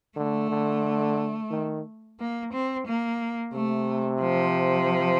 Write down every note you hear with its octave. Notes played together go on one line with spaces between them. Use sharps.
D3 A3
D3
D#3
A#3
C4
A#3
C3 A3
F3